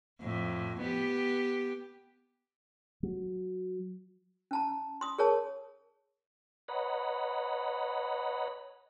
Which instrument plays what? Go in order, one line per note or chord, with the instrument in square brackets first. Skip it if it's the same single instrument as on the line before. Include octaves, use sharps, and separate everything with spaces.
[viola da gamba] F2 A2
B3 G4
[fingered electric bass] F#3
[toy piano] C#4 A5 A#5
C6 D#6
G#4 A#4 C#5 A5
[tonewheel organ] B4 C#5 D#5 F#5 A#5 B5